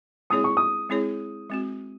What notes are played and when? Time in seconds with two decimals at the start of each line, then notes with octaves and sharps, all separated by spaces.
0.30 G#3 C4 E4 G#4 C#5 D#6
0.44 C#6
0.57 D#6
0.89 G#3 C4 E4 G#4 C#5
1.50 G#3 C4 F#4